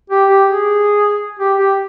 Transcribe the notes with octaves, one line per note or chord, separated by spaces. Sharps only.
G4
G4
G#4
G4
G4